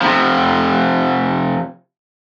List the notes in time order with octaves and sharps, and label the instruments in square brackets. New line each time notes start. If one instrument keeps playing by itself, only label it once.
[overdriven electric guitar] C3 F3